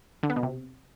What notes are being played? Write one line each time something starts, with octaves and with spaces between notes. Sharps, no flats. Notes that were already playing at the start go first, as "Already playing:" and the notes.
D3
B3
B2
C3